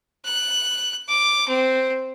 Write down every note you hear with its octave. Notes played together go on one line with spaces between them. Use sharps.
F#6
D6
C4